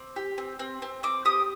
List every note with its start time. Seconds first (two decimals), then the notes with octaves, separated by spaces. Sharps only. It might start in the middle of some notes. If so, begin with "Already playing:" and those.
Already playing: C4 D6
0.16 G4
0.38 C4
0.59 C4
0.82 C4
1.03 C4 D6
1.25 G4 D#6